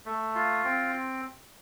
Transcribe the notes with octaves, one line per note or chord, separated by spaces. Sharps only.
A3
F4
C4